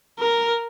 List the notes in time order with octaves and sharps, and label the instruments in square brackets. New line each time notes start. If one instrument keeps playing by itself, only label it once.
[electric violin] A#4